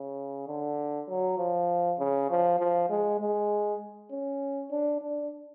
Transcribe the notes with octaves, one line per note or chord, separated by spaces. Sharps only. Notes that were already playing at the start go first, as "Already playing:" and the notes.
Already playing: C#3
D3
F#3
F3
C#3
F3
F3
G#3
G#3
C#4
D4
D4